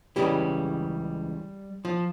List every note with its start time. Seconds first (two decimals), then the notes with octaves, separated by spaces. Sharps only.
0.16 C#2 C#3 E3 G3 G4
1.85 F3 F4